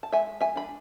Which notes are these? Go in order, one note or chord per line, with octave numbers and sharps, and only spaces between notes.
A5
G#3 E5 G#5
E5 G#5
D4 B5